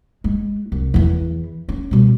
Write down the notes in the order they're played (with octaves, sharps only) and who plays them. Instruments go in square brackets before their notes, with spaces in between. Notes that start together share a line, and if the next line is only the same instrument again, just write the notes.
[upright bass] G#3
C2
E2 E3
C#4
B2 G3